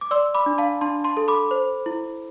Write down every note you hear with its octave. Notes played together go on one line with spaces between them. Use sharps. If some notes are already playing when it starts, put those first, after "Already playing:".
D6
D5 C6 E6
B5 D6
D4
F5 A5
D4 A5 C6
A5 C6
A4
B5 D6
C5
E4